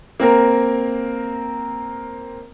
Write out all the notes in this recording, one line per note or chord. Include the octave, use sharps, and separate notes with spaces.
A#3 C4 A#4